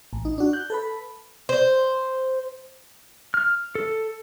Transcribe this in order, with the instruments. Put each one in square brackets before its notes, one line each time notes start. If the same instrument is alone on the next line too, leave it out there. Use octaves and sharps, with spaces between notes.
[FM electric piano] A1
D#4
D4 F#4
F#6 G6
A4 B4 B5
[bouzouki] C5
[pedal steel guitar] F6
A4